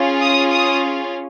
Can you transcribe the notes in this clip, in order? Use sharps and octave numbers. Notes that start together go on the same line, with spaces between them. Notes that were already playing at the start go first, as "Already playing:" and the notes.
Already playing: C#4 F4 G#4
D#6
D#6